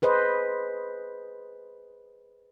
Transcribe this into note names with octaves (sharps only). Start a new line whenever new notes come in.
G#4 B4 C5 D#5